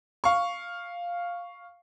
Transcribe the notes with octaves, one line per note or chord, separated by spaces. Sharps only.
F5 C#6